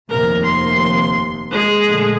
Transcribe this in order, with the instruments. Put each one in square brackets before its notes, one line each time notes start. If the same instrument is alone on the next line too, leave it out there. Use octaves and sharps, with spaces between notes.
[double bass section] F1 D#2 C3 [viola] A#4
[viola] C6
G#3 G#4
[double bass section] A#1 D3 A3